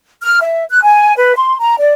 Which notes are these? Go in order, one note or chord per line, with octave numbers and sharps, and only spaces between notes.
F6
E5
F#6
G#5
B4
C6
A#5
D5